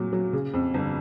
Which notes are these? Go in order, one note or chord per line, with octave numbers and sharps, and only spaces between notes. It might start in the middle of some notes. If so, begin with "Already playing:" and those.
Already playing: A#2 F#3
F#3
C#3
F2
G1